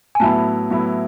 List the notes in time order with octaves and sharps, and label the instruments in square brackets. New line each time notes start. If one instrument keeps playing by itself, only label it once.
[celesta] G#5
[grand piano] A2 F#3 B3 E4 [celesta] A5
[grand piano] A2 F#3 B3 E4